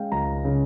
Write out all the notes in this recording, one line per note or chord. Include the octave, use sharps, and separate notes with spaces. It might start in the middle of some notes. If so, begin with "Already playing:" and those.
Already playing: G#3 C#4 F5 G5
C#2 A#5
C#3